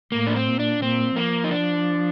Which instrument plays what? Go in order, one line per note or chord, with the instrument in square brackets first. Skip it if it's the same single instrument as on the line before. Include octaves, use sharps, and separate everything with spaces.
[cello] A2 [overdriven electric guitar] A#3
[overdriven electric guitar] D4
C4
[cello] A#2
[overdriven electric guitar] D4
[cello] A#2 [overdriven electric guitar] C4
[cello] F3 [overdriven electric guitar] A#3
[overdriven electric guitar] D#4
D4